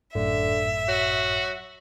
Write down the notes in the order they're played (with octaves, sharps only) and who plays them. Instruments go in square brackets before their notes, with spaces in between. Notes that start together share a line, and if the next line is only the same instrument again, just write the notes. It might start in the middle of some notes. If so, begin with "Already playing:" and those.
[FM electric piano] G#1 F#2 A2 [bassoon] D3 [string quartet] E5
[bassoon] F#3 [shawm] F#4